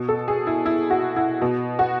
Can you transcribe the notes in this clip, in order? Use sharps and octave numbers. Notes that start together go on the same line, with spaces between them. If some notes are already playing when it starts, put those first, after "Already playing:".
Already playing: B2
A4
G#4
E4
E4
F#4
E4
B2
F#4